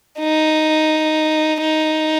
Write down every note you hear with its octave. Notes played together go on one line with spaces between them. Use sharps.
D#4
D#4